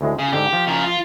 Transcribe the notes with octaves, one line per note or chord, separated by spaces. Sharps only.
D2 A2 G#3
C#3 G#4
G#2 D3 G4
F3
C#3 A#4
F4